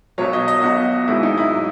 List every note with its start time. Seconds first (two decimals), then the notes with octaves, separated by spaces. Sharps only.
0.18 B1 B2 F#3 C#5
0.33 D#5
0.48 D#5
0.63 B1 B2 F#3 F#4
1.08 G#1 G#2 F#3 E4
1.23 D#4
1.37 E4
1.53 F#3